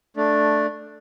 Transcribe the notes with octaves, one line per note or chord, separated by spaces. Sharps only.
A3 D4